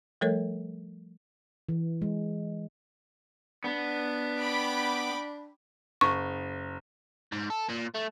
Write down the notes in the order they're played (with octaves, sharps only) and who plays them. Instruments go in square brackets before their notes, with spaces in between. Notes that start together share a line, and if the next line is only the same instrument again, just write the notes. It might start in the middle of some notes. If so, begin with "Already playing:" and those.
[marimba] F3 G3 A3 A4 A#4 C#5
[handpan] E3
G#3
[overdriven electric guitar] B3 [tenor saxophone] D4
[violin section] G5 B5 D6
[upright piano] F#1 [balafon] C#6
[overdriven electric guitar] G#2
A4
A#2
A3